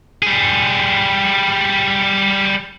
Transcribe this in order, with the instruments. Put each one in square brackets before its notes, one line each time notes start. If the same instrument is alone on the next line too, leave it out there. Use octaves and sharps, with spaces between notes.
[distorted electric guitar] G3 G#4